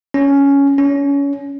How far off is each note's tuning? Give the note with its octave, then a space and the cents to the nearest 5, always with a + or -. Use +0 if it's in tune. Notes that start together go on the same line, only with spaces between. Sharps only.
C#4 +10
C#4 +25